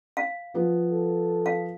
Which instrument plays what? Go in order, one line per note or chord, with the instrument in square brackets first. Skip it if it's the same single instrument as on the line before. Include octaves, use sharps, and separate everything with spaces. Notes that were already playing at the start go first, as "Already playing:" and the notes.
[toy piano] F5
[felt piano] F3 B3 F4
[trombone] A4
[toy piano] F5